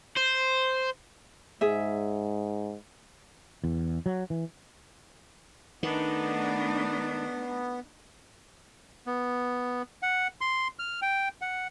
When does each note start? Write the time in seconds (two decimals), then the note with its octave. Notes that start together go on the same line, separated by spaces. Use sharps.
0.17 C5
1.61 G#2 G#4 E5
3.64 E2
4.06 F#3
4.30 E3
5.83 D#3 A3 B3 D4 D#4
9.07 B3
10.03 F#5
10.41 C6
10.79 F6
11.02 G5
11.42 F#5